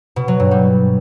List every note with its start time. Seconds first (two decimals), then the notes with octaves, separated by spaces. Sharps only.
0.16 B2
0.28 F#3
0.40 G2
0.51 G3